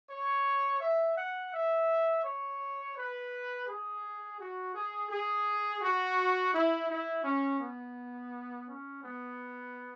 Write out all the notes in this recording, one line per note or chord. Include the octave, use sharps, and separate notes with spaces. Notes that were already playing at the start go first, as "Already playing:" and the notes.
C#5
E5
F#5
E5
C#5
B4
G#4
F#4
G#4
G#4
F#4
E4
E4
C#4
B3
C#4
B3